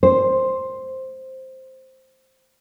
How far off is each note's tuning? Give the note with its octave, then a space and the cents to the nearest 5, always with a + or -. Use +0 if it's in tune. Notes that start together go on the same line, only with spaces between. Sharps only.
C5 +5